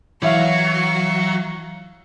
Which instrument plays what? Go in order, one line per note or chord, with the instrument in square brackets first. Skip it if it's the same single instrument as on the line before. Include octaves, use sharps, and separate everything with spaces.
[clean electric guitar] E3 [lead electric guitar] F#3 [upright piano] C#5 E5 F5 [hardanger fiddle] C#6